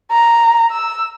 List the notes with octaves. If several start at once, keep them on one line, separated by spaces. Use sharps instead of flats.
A#5
E6